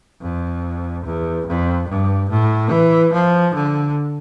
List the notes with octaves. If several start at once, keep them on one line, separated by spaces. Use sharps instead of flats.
F2
E2
F2
G2
A2
E3
F3
D3